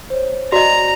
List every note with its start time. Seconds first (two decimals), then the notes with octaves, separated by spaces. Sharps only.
0.10 C5 C#5
0.52 F#4 D5 D#5 A#5